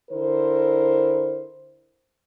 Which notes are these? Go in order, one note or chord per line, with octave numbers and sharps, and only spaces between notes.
D3 E4 A#4 C5